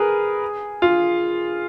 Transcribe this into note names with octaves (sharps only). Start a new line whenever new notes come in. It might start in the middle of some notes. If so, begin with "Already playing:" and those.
Already playing: G#4 A#4 B4
F4